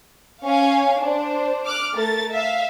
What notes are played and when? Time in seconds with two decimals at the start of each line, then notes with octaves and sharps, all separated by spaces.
0.44 C#4 C#5 F5 G#5
0.98 D4 C5
1.65 D6 F6 F#6
1.95 A3 A#4 A6
2.31 E5 F5